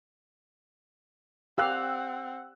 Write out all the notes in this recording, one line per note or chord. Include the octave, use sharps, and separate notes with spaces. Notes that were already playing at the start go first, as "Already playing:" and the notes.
C4 G4 F5 F#5 E6 F#6